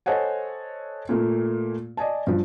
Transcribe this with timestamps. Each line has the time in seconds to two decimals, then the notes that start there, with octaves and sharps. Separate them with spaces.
0.06 A4 C5 C#5 D#5 F#5 G#5
1.09 A#2 A3 A#3
1.97 D5 D#5 G#5 A5
2.27 G2 F3